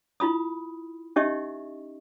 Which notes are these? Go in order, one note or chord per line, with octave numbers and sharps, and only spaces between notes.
E4 F4 B5 D#6
C#4 D#4 G4 D#5 E5 C#6